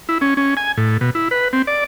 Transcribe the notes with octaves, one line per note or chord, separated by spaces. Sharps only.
E4
C#4
C#4
G#5
A2
B2
E4
B4
C4
D5